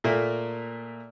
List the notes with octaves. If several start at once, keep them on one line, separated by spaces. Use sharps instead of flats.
A#2 A3 A#3